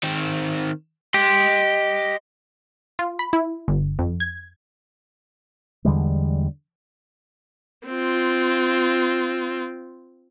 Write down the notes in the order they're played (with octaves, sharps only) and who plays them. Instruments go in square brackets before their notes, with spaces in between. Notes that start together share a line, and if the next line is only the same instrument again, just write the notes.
[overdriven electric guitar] D#3 C4
[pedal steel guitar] G4 [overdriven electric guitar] D#5 C6
[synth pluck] F4
B5
E4
G1
F2
G#6
[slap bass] E2 D3 G3 G#3
[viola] C4 F4